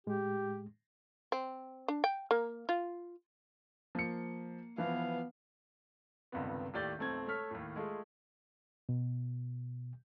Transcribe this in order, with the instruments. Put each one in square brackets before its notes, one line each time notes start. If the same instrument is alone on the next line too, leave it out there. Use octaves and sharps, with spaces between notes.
[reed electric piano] A2 G#3 [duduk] G4
[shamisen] C4
D4
G5
A#3
F4
[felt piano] F3 [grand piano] A#3 C#7
[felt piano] E3 F3 [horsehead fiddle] B3 F5
[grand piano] G1 C#2 G2 C3 D#3 B3
D#2 A2 G4 D5 G6 A6
B1 F2 A3 C4 G#6
A3 A4 C#5 F6 B6
D#2 A2
G#3 A3 F4 G#4
[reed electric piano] B2